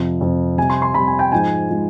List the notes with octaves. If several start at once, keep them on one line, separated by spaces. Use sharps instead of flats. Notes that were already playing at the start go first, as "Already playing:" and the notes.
Already playing: F2 C3 F3
F2 C3 F3
C3 G3 G#5
C6
C6
C3 G3 B5
G#5
G5
G#2 F3 G#3 G#5
F3 G#3